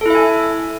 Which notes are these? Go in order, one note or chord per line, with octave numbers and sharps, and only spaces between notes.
E4 A4 E5 G#5